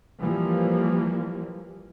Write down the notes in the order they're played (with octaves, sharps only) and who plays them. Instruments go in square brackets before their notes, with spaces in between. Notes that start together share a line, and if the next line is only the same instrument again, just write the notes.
[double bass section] E3 F3 G3 A#3